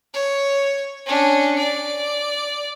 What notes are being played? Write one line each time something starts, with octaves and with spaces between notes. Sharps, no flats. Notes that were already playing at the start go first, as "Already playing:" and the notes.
C#5
C#4 D4
D5